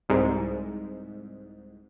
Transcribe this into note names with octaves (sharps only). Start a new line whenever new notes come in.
C2 G#2